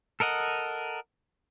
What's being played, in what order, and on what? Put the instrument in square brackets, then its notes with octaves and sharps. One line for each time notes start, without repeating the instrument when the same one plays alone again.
[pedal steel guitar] A4 A#4 D#5 F#5